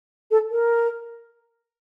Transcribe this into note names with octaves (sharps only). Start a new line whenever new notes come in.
A4
A#4